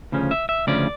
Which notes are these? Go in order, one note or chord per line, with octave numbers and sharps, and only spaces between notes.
D2 C#3 F3 C#4
E5
E5
D2 C#3 F3 C#4 D5